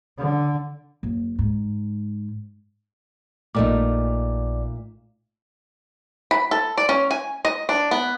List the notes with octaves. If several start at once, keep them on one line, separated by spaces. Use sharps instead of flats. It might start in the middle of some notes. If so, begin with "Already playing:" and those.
D3
F#1
G#2
A#1 A#2 A3 D#4 D5 D6
B5
A4
D5
C#4
G#5
D#5
D4
B3